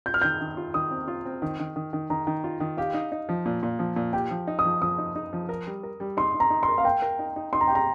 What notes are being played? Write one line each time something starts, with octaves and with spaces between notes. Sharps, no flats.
F4 G6
F6
D#3 G6
D#3
F4
D#3 D#6
C4
F4
C4
D#3
D#3
D#3
D#3
D#3 A#5
D#3
F4
D#3
G4 F5
D#4
D#4
F3
A#2
A#2
F3
A#2
G4 G5
F3
D#4
D#6
F3
F3 D#6
D#4
D#4
F3
A#4
G3
A#4
G3
D#4 C6
D#4
A#5
D#4
C6
A#4
F5
A#4 G5
A#4
D#4
D#4
D#4 C6
A#5
G4 G5
A#5